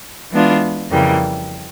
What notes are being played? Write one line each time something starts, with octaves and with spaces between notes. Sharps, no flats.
E3 G#3 B3 D4 F4
F2 C#3 E3 G3 A#3